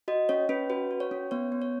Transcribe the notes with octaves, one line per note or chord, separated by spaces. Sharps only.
F#4 D#5
C#4 C#5
C#4 B4
F#4 B4
F#4
C#5
C#4
B3 C#5
B3
C#5